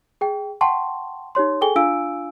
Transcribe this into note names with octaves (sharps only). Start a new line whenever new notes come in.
G#4 G5
F#5 G5 A5 C6 C#6
D#4 G4 C#5 C6
G#4 A4 G5 G#5 G7
D4 F4 F5 G#5 E6 D7